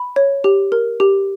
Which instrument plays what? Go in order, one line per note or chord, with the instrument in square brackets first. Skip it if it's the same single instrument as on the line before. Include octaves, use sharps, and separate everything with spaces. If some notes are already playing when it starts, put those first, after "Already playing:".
Already playing: [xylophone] B5
C#5
G4
A#4
G4